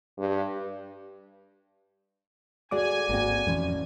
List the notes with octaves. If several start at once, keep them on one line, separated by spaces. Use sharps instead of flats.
G2
D2 F#4 G#4 D5 G#5 D6
G#1 A#3 C4 F#4
F2 A2 E3 F3 C#4